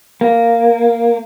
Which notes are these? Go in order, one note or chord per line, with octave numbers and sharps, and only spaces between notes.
A#3